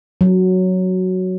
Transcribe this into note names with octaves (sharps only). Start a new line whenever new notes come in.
F#3